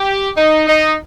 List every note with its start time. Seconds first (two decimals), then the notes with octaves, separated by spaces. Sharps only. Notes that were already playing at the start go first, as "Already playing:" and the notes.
Already playing: G4
0.36 D#4
0.67 D#4